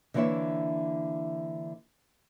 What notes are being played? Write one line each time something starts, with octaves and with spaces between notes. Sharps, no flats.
D3 E3 A#3 E4 C#5 E5